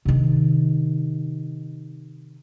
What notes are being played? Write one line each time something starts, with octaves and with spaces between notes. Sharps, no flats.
C3 D#3